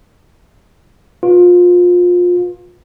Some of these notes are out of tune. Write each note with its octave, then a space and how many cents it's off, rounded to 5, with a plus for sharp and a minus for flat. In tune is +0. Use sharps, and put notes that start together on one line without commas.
F4 +25 B4 -10